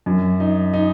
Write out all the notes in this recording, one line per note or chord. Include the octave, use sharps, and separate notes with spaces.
F#2
D#4
D#4